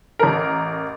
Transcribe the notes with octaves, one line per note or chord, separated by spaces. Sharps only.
A1 A#4